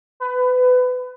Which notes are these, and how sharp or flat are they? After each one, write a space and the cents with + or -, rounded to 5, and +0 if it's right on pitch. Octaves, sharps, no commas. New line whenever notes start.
B4 +25